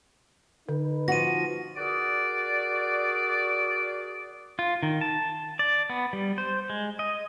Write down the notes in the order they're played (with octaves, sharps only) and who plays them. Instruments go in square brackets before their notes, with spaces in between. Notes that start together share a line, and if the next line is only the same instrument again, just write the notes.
[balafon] D3 [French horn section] D#4 B4
[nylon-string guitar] F3 F#4 [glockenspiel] A#6 D#7
[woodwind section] F#4 G#4 A#4 D5
[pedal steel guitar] F4
D#3
A5
D5
B3
G3
C5
G#3
D#5